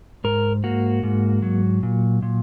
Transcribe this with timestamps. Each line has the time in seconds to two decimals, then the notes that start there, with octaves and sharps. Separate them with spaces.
0.24 G#2 A#4
0.64 A#3 F#4
1.03 G#2
1.42 F#3
1.83 A#2
2.22 A#2